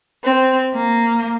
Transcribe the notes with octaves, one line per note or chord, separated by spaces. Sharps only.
C4
A#3